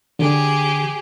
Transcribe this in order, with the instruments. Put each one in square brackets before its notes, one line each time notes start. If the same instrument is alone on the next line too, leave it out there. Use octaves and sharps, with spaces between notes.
[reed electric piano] D3 [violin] G4 G#4